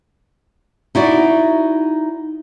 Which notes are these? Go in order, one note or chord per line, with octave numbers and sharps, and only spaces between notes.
D#4 E4 F#4 D5